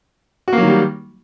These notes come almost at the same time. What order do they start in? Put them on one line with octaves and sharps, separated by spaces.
F#4 A#3 F#3 D#3 G3